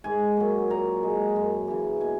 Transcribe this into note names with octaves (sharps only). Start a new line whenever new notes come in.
G#2 G#5
F#3 A#3
A#2 A#5
G#3
F#2
C#3 E3
B2 G#5